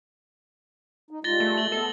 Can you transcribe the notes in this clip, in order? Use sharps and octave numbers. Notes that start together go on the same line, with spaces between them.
D#4
G3 G#3 F4 A6 A#6 G7
A3
F#7 G7
B3 A4